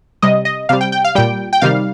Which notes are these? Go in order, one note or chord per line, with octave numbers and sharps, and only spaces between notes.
C3 G3 D#5
D#5
C3 G3 F5
G5
G5
F5
A#2 G3 G5
G5
C3 D#3 G3 F5